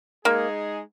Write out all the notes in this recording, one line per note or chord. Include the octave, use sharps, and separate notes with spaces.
G#3 A#3 D#4 G#4